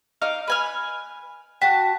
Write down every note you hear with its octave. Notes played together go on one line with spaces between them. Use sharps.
D#4 F5 D6
B4 G#5 F6
F#4 G5 A5 B6